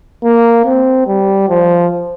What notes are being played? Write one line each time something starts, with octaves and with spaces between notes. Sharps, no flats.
A#3
C4
G3
F3